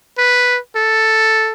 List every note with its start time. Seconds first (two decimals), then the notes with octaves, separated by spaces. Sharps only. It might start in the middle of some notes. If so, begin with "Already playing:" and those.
0.18 B4
0.76 A4